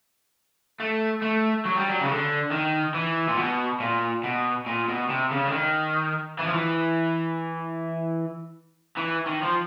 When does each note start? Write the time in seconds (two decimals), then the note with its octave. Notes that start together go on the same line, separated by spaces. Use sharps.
0.80 A3
1.22 A3
1.66 F#3
1.77 G3
1.89 F#3
2.01 C#3
2.09 D3
2.52 D#3
2.94 E3
3.28 A#2
3.37 B2
3.80 A#2
4.23 B2
4.66 A#2
4.88 B2
5.09 C3
5.31 C#3
5.47 D3
5.52 D#3
6.39 E3
6.47 F3
6.54 E3
8.97 E3
9.26 D#3
9.42 F3